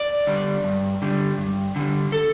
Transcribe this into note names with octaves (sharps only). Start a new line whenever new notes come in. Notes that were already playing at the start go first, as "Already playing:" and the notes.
Already playing: D5
D3 G3
G2
D3 G3
G2
D3 G3
A4